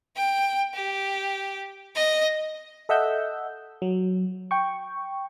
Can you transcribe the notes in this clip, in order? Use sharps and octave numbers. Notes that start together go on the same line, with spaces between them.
G5
G4
D#5
A4 D#5 E5 F#5 E6 G6
F#3
G5 C#6